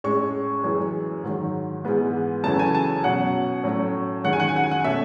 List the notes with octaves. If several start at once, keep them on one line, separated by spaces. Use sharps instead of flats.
A2 G#3 C#4 C#6
F#2 E3 G#3
G#2 D#3 F#3
G#2 E3 G#3 B3
F#2 C#3 E3 A3 C#4 A5
G#5
A5
B2 F#3 C#4 F#5
A2 F#3 A3 C#4
F#2 D#3 G#3 C#4 F#5
G#5
F#5
G#5
F#5
G#5
F#5
B2 A3 C#4 E5